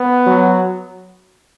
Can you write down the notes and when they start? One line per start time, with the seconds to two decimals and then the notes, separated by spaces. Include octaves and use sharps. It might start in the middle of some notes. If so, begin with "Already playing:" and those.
Already playing: B3
0.27 F#3